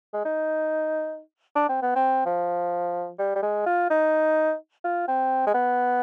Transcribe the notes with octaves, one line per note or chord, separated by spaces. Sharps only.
G#3
D#4
D4
C4
B3
C4
F3
G3
G3
G#3
F4
D#4
F4
C4
G#3
B3